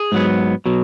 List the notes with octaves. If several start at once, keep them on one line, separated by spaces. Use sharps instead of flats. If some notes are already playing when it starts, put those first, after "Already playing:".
Already playing: G#4
G#2 F#3 B3
B2 F#3